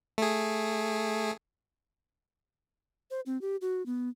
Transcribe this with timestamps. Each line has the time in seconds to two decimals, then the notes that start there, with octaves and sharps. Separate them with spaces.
0.18 A3 G#4
3.11 C5
3.26 C4
3.41 G4
3.61 F#4
3.86 B3